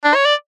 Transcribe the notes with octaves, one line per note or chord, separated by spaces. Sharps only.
D4
C#5
D5